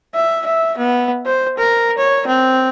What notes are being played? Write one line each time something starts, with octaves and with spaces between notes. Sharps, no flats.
E5
E5
B3
C5
A#4
C#5
C4